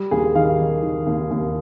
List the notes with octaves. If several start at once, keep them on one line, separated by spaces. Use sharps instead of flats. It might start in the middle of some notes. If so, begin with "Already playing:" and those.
Already playing: G3
D#2 G#4
D#3 F5
D#3
D#3
D#2
D#2